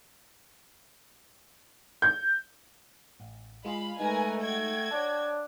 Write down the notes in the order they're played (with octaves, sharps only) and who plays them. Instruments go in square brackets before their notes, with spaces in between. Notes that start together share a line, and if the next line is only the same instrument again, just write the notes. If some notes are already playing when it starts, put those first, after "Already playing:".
[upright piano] G6
[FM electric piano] A1
[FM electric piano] G#3 F4 G#4 [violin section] F5 B5
[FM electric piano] G#3 D#4 [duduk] A3 [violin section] A#4 B4 G#5
[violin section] F#4 G5 G#6
[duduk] D4 [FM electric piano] C#5 A5